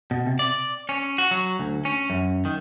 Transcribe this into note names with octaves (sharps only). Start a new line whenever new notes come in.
B2
C3
D5
C#4
F#4
F#3
D2
C#4
F#2
D#3